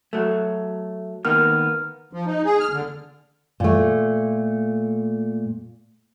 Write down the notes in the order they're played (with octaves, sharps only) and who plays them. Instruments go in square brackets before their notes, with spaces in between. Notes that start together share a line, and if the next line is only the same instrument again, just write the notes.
[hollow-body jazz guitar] F#3 A3
[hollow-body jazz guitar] D#3 A#3 B3 [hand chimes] F6
[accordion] F3
D#4
G#4
F6
D3
[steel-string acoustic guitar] A#2 A3